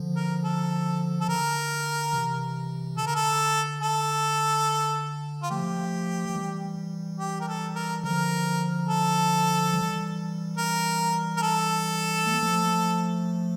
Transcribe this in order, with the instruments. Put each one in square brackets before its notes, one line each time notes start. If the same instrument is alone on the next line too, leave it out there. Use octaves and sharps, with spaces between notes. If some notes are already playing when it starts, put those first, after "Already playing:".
Already playing: [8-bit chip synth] D3 F3
[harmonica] A#4
A4
A4
[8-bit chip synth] D3 [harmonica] A#4
[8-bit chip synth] C3 E3
[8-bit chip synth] D3 [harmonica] A4
[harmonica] A#4
A4
A4
F4
[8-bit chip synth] F3 A3 [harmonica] G4
[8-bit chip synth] F3
E3 G3
[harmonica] G4
A#4
A4
A#4
[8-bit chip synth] D3 F3 [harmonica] A#4
[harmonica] A4
[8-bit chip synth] E3 G3
[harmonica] A#4
A#4
A4
[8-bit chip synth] A3
A#3
F3 A3